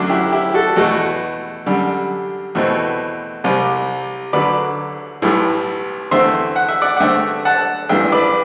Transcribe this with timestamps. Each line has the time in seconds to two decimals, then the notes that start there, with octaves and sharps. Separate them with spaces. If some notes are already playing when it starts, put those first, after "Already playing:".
Already playing: F#2 D3 F#3 A3 D4 F#4
0.09 E4 G4
0.32 E4 G4
0.54 F#4 A4
0.76 E2 B2 A3 F#4 A4
1.66 F#2 D3 G3
2.55 E2 B2 A3 C4
3.44 C2 C3 G3
4.33 D2 D3 F#3 B4 D5
5.22 B1 A2 E3 G3
6.11 E2 D3 A3 C4 C5 E5
6.56 F#5
6.69 E5
6.82 D5 F#5
6.96 F#5
7.00 G2 D3 A3 C4 E5 G5
7.45 F#5 A5
7.89 A1 G2 E3 E5 G5
8.12 B4 D5